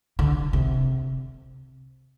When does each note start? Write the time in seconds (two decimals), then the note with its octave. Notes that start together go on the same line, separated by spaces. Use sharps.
0.19 D3
0.53 C3